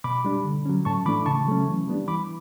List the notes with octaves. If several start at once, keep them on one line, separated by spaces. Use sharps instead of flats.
B2 B5 D6
G3 D4
D3
F#3 C#4
A2 A5 C#6
E3 A3 D4 B5 D6
C#3 A5 C#6
F#3 A3 C#4
E3
G3 B3 D4
E3 B5 D6